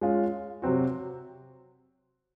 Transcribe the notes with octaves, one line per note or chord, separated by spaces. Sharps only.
G#3 C#4 F4
C3 F#3 C4 F#4